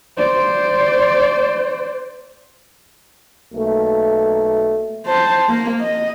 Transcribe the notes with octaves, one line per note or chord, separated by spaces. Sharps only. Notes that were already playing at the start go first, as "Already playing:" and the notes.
C5 D5
B1 A3 A#3
C5 A5
A#3
D#5